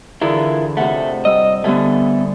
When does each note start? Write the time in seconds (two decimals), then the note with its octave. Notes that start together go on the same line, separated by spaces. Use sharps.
0.21 D3 E3 E4 F4 G#4 A#4
0.77 F2 C3 A3 F#5
1.25 G3 D#5 E6
1.64 D3 G3 A3 B3 G#5